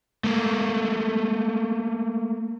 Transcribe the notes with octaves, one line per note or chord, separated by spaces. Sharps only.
A3 A#3